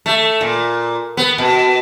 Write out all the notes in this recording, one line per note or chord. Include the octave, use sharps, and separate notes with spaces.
A3
A#2
B3
B2